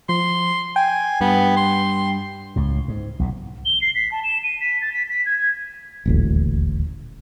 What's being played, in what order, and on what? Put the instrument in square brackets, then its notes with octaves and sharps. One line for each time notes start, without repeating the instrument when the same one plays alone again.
[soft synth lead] F3 [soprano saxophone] C6
[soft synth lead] G5 [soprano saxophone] G#5
[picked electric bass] G2 [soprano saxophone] B3
[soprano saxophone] C6
[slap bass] C#2 A2
G#2
B1 A#2
[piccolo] G7
C7
B6
A5
E7
D#7
B6
A6
B6
B6
G#6
G#6
[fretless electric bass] D#1 A1 D2